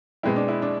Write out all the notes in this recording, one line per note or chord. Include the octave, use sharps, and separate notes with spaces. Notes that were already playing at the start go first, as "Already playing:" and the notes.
B2 G#3 C4 E4
D4
E4
D4